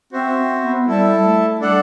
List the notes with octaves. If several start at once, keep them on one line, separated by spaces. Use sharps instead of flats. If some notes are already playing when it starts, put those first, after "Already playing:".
C4 F#4 C5 E5
C4
B3
G3 E4 A4 E5 A5
A3
G3 D4 A4 D5 F#5